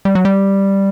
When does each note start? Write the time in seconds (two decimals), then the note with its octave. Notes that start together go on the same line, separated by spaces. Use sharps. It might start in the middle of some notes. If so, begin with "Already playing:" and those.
0.05 G3
0.15 F#3
0.25 G3